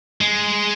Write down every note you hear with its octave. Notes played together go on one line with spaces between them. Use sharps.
G#3